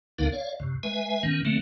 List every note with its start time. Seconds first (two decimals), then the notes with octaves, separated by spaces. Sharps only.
0.18 D2 D3 B3 D#4 A#4 F5
0.32 C#5 D5 F5
0.60 F#2 C3
0.83 G#3 B4 E5 G#5
1.23 A#2 D#3 B3 C#4
1.45 D3 F#3 A3 A#3 C4